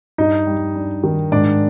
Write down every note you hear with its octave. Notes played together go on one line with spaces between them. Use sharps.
G2 D#4 D#5
G3
D4
D#3
G#2 D4 D5